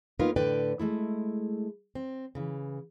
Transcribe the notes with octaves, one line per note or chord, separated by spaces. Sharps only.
A#3 B3 D#4 F4 A#4 B4
A2 D3 B4 D5 G5
G#3 A3 E4
C4
C#3 E3